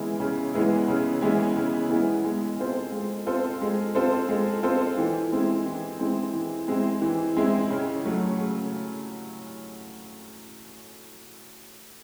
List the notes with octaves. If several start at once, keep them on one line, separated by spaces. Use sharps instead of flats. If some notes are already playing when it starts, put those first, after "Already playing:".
Already playing: C#3 E3 G#3 B3 E4
C#3
E3 G#3 B3 E4
C#3
E3 G#3 B3 E4
C#3
E3 G#3 B3 E4
G#3
C4 F4 A4 C5
G#3
C4 F4 A4 C5
G#3
C4 F4 A4 C5
G#3
C4 F4 A4 C5
E3
G#3 C4 E4
E3
G#3 C4 E4
E3
G#3 C4 E4
E3
G#3 C4 E4
C#3
F#3 A3
C#3